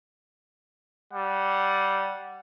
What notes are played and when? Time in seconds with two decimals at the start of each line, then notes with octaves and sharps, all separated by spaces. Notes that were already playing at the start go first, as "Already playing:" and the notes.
1.13 G3 F#5